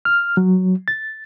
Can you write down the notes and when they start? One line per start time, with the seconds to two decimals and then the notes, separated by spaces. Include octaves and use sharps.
0.05 F6
0.37 F#3
0.88 A6